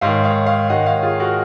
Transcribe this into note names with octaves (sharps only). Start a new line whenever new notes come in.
G#2 D#3 C#5 F5
C#5 F5
C#5 F5
G#2 D#3 D#5 F#5
C#5 F5
F4 G#4
F#4 A#4